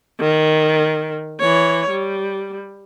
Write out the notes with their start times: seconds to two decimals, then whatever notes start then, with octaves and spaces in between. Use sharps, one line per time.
0.21 D#3
1.40 E3 C#5
1.91 G3